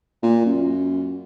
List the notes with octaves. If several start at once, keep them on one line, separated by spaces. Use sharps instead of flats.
A#2
F#2